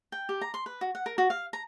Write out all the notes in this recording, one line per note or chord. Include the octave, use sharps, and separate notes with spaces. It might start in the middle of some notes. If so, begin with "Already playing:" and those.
G5
G4
A#5
C6
B4
F#4
F#5
A#4
F#4
F5
A#5